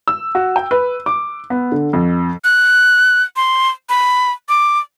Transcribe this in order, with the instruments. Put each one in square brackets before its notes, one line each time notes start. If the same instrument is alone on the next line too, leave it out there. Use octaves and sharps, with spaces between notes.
[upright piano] E6
F#4
G5
B4
D6
B3
D3
F2
[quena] F#6
C6
B5
D6